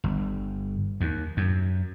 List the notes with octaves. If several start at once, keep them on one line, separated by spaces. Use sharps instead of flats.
G1
D#2
F#2